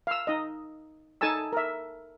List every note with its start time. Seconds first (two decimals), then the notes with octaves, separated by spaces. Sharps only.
0.07 F5 E6
0.27 D#4 D#5
1.21 D#4 A4 G#5 A5 E6
1.52 A#4 E5